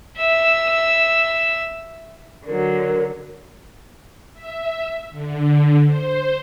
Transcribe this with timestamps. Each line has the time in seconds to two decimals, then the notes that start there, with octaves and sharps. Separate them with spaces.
0.18 E5 E6
2.47 D3 F#3 A#4
4.33 E5
5.11 D3
5.85 C5